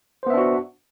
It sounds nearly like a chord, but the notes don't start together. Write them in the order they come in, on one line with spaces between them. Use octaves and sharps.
C5 B3 E5 D4 F#4